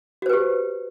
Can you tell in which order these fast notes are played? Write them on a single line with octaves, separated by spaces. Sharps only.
F#4 C5 B4 G4